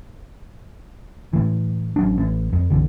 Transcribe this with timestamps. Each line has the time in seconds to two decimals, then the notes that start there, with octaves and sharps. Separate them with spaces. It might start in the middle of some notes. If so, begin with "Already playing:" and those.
1.33 A2 E3
1.96 A1 F#3 C#4 D4
2.18 A1
2.53 F2
2.70 F#1 B1 D3 E3